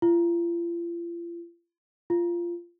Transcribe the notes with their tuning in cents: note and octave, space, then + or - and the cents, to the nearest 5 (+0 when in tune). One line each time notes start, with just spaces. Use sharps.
F4 -40
F4 -15